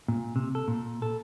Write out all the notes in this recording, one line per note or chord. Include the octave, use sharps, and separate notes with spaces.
A#2
C3
A4
A#2
A4